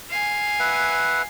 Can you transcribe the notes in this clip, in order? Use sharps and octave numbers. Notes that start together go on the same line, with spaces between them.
F5 G#5
B4 E5 F#5